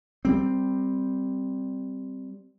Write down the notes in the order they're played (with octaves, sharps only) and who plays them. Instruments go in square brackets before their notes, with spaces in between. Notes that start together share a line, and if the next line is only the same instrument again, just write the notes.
[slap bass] G3 C4